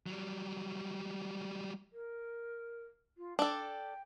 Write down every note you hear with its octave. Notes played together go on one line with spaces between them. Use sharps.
F#3 G3
A#4
F4
D4 A4 G5